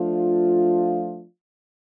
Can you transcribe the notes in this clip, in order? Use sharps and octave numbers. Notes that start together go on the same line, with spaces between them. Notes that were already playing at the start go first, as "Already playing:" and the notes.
Already playing: F3 A3 D4 F4